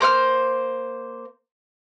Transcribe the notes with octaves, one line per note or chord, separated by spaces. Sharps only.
A#3 C5 F#5 F6